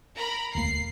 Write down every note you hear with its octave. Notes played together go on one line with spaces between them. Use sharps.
A#4 A#5 B5
E1 D2 A#3 C7